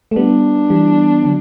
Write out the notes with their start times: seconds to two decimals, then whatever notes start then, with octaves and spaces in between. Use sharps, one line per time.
0.11 A3
0.16 G3 B3 D4
0.70 E3 G3
1.24 D3 F#3